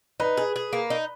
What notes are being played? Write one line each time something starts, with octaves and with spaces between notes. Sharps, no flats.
D#4 B4
G#4
G#4
A#3
D#4